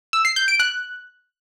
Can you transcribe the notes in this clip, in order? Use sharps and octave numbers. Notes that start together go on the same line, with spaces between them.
E6
C7
G6
D7
F#6